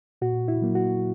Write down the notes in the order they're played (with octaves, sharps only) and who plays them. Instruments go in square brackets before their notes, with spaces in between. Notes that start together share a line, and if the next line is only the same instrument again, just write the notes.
[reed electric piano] A#2 F#4
E4
F#3 A#3
F#4